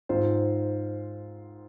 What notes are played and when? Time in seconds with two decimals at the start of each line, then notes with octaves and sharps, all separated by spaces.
0.09 G#2 D#3 C4 F4 C5